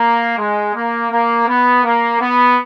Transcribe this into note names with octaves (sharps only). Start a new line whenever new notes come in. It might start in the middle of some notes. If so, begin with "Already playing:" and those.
Already playing: A#3
G#3
A#3
A#3
B3
A#3
B3